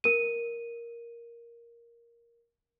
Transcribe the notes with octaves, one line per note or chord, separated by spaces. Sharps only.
A#4 D#7